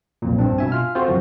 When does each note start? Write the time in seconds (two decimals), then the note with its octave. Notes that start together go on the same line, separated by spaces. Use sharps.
0.22 B1 F2 A#2
0.39 G2 C4 D4
0.58 B2 E5 G#5
0.72 F4 F6
0.95 C4 F4 F#4 G#4 A4 C5
1.07 F#2 C#3 F3 F#4